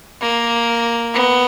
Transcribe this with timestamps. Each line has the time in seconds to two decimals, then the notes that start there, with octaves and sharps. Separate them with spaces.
0.21 A#3
1.14 B3